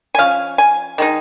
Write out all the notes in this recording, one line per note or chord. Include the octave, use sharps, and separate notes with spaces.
G#5
F3 C#4 F5
G#5
D#3 G#3 D#4